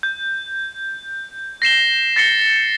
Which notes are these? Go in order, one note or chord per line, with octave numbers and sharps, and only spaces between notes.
G6
A#6 C7 E7 G7
A6 A#6 C7 C#7 G7